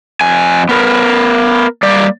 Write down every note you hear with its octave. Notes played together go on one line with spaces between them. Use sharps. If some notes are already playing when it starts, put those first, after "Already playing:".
F2 G#5
B3 A#4 B4
G3 A#3 D5